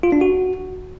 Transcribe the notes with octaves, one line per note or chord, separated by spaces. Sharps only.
F4
D4
F#4